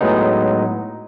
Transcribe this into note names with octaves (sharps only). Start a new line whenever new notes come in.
A2 F#3 G#3 B3 D#4